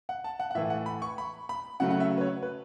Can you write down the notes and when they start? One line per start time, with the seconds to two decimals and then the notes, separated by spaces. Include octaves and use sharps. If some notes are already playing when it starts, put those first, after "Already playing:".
0.09 F#5
0.24 A5
0.39 F#5
0.51 F#5
0.55 A2 E3 A3 E5
0.70 F#5
0.86 B5
1.02 C#6
1.18 B5
1.49 B5
1.80 C#3 F#3 A3 F#5
1.91 F#5
2.00 E5
2.17 B4
2.21 C#5
2.43 B4